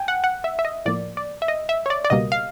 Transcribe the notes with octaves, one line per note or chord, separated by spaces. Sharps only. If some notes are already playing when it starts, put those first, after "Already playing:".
Already playing: G5 G#5
F#5
F#5
E5
E5
D#5
A2 F3 A#3 D5
D5
E5
D#5
E5
C#5
D5
D5
C#2 B2 G3 A#3 D#5
F5